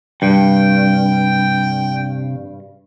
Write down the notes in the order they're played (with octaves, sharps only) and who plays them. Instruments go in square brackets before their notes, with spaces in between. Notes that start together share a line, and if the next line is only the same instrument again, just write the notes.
[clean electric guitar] G2 [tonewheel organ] C3 [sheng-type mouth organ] G5